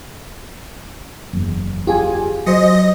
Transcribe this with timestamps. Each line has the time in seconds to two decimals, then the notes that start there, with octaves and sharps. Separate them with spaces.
1.33 F#1 E2
1.87 F4 G4 G#4 G#5
2.46 F#3 C5 D#5